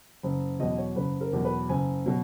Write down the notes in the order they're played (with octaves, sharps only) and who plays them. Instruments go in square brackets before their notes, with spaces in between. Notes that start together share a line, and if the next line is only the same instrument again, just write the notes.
[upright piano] F#1
E2 B2 F#3 D#5
C#5
F#1 B4
A#4
E2 B2 F#3
B4
F#1 G#5
B2 F#3